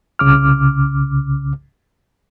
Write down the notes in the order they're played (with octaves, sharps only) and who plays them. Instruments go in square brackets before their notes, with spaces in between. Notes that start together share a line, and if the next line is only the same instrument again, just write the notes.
[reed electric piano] C2 C#3 D6 F6